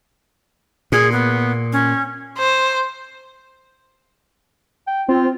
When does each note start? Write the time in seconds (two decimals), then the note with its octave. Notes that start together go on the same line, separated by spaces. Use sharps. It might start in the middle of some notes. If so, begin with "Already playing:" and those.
0.92 A#2 G#4
1.12 B3
1.72 C#4
2.38 C5
4.87 G5
5.09 C4 F4